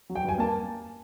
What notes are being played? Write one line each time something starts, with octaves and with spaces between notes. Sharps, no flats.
F#3
G5
G2 G#5
A#3 A5